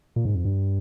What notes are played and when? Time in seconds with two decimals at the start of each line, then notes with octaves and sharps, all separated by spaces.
0.16 A#2
0.25 G#2
0.35 F2
0.45 G2